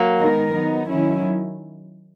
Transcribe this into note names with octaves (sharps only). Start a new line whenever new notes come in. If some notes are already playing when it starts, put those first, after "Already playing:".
Already playing: F#3 A#3
D#3 G#3 B3 D#4 A#4
F#3 B3 D#4
D#3 F#3 C#4 E4